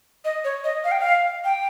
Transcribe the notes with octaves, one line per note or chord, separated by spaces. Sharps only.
D#5
C#5
D#5
F5
G5
F5
G5